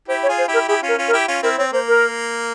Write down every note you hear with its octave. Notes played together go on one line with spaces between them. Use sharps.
E4 G4 C5
C#5
F4 G#4
C5
E4 G4
A#4
E4 G4 G#4
C#4 F4
A#4
C#4 F4
A#4
E4 G4
C#4 F4
C4 E4 A#4
C4 C#5
A#3 C5
A#4